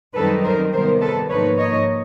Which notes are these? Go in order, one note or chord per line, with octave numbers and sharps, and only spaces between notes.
F#2 D#3 G3 C4 D#4 A4 B4
A#4 C5
C3 D#3 G3 B3 A#4 C5
A4 B4
G#2 F3 A#3 D#4 B4 C#5
C#5 D#5